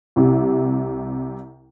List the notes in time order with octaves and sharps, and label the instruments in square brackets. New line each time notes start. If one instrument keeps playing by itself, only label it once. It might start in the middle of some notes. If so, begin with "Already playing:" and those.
[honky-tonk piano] C2 C3